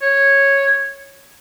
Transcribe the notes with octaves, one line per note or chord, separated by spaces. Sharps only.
C#5